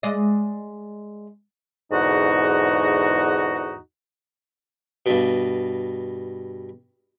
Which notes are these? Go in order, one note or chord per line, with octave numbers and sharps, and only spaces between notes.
G#3 D5 D#5
E2 G#2 D3 D#4 F#4
G2 B2